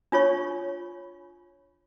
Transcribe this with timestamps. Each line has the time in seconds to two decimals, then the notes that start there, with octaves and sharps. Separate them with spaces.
0.12 D4 F4 C#5 C#6